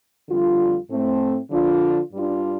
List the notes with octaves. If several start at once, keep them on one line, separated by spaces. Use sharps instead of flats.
F2 D3 G3 F4
A2 A3 C4
D3 F3 D4 F4
G2 G3 D4 F4